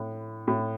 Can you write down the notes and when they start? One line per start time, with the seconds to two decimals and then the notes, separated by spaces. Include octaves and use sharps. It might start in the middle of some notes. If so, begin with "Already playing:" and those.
Already playing: A2
0.47 A2